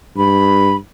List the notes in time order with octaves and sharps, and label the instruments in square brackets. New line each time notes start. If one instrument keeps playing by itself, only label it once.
[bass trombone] G2 [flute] B5